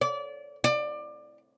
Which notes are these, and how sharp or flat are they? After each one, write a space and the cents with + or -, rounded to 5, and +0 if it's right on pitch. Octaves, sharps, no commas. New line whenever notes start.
D5 -25
D5 +20